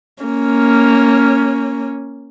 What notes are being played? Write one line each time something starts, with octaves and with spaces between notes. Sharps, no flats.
A#3 C#4